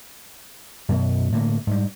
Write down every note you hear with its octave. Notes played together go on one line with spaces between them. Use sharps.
F#2 B2
A2 D3 A#3
G#2 G3